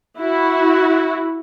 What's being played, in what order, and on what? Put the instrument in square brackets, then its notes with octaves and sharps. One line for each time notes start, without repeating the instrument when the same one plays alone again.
[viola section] E4 F#4